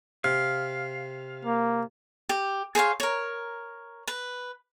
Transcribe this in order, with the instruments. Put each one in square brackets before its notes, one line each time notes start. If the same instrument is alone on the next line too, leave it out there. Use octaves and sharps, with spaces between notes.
[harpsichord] C3 [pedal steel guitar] F5
[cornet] A#3
[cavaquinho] G4
G#4 C5 C#5 F5
A#4 C#5
B4